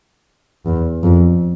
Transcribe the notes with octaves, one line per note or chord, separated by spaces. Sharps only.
E2
F2